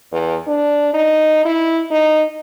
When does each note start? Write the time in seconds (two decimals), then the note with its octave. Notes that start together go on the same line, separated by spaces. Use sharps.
0.12 E2
0.47 D4
0.93 D#4
1.45 E4
1.91 D#4